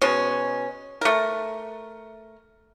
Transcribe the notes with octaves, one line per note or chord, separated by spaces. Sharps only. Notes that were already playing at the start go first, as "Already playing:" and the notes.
B2 G#3 C#4
A3 A#4